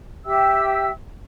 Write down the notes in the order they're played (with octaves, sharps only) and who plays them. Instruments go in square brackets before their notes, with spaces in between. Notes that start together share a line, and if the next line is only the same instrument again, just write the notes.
[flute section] G4 E5 G5 E6